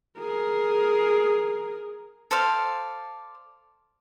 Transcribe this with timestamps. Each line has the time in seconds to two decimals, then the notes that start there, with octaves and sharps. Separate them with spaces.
0.19 G#4 A#4
2.31 A4 C5 D5 F5